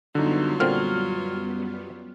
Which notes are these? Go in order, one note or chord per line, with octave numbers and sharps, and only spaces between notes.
F#2 D3 F#3 G3 B3 D#4 F4
A#2 D3 C4 F6